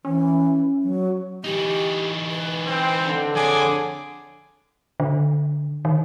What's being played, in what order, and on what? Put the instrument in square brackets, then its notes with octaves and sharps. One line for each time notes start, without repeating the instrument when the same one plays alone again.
[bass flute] E3 [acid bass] C#4
[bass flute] F#3
[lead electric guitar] E3 D#4 [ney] G4
[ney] B4
[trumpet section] C4
[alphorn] D3
[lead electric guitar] F2 [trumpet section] G#4 G#5 D6 [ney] C#5
[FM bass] D3
D#3